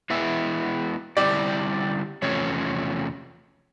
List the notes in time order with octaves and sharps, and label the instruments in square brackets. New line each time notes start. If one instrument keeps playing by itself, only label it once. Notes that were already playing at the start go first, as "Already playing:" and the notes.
[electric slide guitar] E3 G#3 B3 E4 [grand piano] E5
[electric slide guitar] D3 G3 C4 E4 G4 [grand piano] D5
[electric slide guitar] E2 C3 F3 A3 C#4 [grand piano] C#5